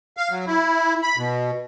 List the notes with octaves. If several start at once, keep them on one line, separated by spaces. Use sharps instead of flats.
F5
F#3
E4
B5
B2